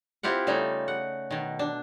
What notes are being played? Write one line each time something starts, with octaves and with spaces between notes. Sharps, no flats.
C4 E4 F4 G4 F#5
C#3 G3 A3 D#4
F#5
B2 D#3
D4